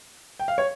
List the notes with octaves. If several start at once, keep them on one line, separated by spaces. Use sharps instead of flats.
G5
F5
C#5